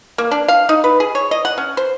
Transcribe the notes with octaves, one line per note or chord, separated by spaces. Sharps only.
A#3
D4
F5
D#4
B4
G#4
C#5
D#5
F#5
C#4
C5